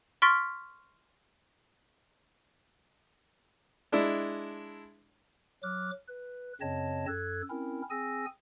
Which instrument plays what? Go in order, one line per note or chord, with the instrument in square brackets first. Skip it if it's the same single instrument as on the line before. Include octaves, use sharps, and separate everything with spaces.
[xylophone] C6 C#6 F6 A6 B6 D7
[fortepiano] G#3 D4 E4
[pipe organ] F#3 D6 F6 F#6
B4
F#2 C#3 C4 C#5 D#5 A5
F#2 A4 F#6 G#6
C4 C#4 E4 A#4
C4 G#4 G#5 E6 A#6